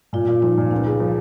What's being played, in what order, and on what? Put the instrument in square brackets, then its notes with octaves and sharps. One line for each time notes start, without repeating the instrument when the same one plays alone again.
[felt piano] A#2 [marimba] F4
[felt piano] A#2 [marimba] F4
[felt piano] F3 [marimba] D#4
[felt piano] A#2
[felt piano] C#2 [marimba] D#4
[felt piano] C#3
F3